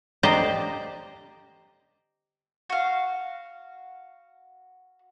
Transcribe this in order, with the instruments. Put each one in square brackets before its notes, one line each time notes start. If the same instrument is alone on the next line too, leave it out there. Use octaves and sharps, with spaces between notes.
[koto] G4 C5 D5 D#5 A#5
[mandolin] F#4 F5